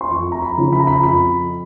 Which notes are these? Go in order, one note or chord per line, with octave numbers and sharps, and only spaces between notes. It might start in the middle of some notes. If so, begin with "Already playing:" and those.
C6
F2 C#6
A#5
B5
C#3 F3
B5
A#5
B5
F2 B5